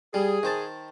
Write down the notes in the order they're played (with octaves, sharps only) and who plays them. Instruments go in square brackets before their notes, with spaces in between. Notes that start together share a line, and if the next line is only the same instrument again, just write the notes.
[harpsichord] G3 [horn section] G#4
[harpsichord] D#3 C5 A5